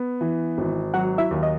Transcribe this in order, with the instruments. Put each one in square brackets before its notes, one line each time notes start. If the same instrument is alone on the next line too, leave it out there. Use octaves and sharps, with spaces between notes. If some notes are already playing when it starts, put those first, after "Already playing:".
Already playing: [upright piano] B3
E3
G#1
[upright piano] F#3 [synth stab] F#4 F#5
[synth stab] E4 E5
[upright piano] D#2
[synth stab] D#5